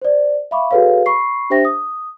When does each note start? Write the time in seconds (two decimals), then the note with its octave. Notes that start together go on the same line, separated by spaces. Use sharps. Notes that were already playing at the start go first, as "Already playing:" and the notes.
0.02 C5 D5
0.51 E5 F5 B5 C#6 D6
0.71 F#4 G#4 A4 B4 C#5 F5
1.06 B5 C#6 C7
1.50 D4 G4 C5 E5 G5 A#6
1.65 D#6